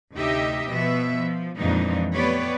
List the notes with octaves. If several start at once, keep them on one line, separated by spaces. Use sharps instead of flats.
D2 C3 D#4 G4 D#5 E5
B2 F3 B3 E5
F3
F2 A#2 E3 G#3 D4 D#4
A3 B3 G4 B4 C#5 D5